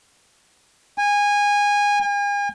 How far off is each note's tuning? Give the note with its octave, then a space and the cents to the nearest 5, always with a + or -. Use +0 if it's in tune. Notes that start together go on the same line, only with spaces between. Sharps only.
G#5 -20
G#5 -40